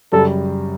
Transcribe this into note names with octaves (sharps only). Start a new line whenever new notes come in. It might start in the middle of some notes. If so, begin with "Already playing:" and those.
F#2 C#3 G3 A4